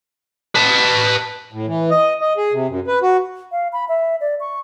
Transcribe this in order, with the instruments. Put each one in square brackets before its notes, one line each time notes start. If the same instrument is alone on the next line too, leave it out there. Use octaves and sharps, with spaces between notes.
[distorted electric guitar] B4 A5
[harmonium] A2
E3
D#5
D#5
G#4
C3
F#2
B4
F#4
[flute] F5
B5
E5
D5
C#6